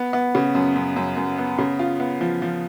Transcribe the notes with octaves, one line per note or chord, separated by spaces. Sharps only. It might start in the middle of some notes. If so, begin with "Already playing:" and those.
Already playing: B3
B3
C#3
F#2
F#2
F#2
F#2
B3
C#3
F4
B3
F3
F3